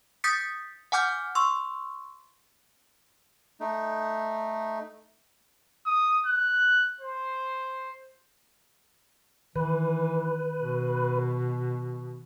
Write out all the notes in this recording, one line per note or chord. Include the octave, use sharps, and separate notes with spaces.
D#6 G6 A6 B6 C#7
F#5 G#5 D6 F6 G6
C6 C#6 E6
A3 D#4
D#6
F#6
C5
D#3 E3 B4
B2